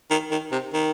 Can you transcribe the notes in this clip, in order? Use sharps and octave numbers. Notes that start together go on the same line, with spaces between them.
D#3
D#3
C3
D#3